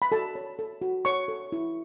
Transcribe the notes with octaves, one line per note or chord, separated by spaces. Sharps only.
B5
F#4 A4 A5
C#5
A4
F#4
C#5 C#6
A4
E4